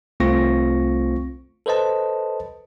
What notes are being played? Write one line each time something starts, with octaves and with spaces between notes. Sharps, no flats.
C2 A3 C4 F4 C#6 A#6
A4 B4 C5 D#5 A5